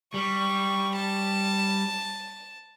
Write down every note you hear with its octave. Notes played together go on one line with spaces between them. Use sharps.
G3 C#6
A5